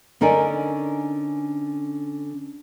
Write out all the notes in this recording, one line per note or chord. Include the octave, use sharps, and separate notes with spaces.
D3 C#4 D#4 A#4 D5 G#5